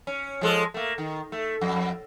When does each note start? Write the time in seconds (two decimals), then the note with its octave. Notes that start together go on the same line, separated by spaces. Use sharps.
0.07 C#4
0.41 F3 G#3 A4
0.74 A3 A#3
0.98 D#3
1.32 A3
1.61 F2